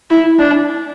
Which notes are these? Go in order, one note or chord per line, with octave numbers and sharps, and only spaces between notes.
E4
D4